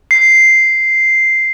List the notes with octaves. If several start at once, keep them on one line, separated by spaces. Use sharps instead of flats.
C7